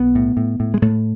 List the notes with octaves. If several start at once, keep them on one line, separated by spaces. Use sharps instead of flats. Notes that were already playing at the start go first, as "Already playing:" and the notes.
Already playing: B1 B3
A2
A2
A2
G#3
A2 A3